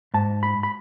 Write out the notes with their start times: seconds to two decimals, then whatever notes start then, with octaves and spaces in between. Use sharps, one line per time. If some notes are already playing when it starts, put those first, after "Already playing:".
0.14 G#2 A5
0.43 B5
0.63 B5